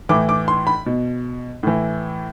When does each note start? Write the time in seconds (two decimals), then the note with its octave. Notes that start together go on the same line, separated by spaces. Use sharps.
0.09 A2 E3 D6
0.29 D6
0.48 C6
0.67 B5
0.86 B2
1.63 A2 E3